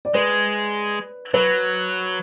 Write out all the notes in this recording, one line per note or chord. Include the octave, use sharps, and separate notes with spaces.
D5
G#3 B4
F#3 B4